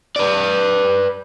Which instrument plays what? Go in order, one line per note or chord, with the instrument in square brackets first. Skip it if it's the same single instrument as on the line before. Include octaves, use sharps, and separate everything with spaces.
[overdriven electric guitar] B4 D5